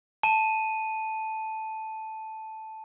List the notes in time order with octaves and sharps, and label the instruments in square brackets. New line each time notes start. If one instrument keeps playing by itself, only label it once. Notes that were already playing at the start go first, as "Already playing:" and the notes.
[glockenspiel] A5 D#7